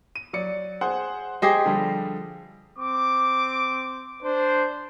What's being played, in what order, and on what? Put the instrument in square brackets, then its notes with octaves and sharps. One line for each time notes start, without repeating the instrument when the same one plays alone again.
[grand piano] D#7
F#3 D5 C#7
G#4 C5 F#5
[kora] G4 G#4 C5 [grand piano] D#5 A#6 C7
[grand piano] D3 F3 G3
[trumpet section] C4 D6
D4 C5